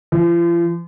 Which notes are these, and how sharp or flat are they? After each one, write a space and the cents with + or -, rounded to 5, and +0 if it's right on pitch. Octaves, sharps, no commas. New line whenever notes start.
F3 -40